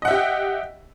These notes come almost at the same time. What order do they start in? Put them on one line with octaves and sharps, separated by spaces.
D#5 F#5 E5 G4 G5